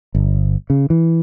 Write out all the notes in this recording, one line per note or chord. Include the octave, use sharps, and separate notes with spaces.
G1
C#3
E3